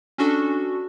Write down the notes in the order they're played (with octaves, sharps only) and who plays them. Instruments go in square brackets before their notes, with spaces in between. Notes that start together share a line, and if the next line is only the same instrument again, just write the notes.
[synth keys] C#4 D4 F#4 A4